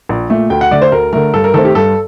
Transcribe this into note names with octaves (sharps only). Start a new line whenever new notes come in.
A#1
A#2 A3
D2 G5
F#5
D3 A3 D5
C5
D2 A#4
D3 A3 A#4
G2 A4
A#4
D#3 A3 C4 A4
G4
G2 A4